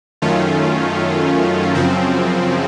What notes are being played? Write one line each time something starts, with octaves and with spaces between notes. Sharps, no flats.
F#2 D#3 A3 C#4 F4
F#2 C#3 F3 C4